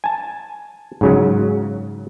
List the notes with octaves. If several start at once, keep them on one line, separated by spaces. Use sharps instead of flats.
G#5 A5
G#2 C#3 F#3